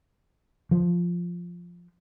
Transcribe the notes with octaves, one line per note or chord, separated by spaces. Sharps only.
F3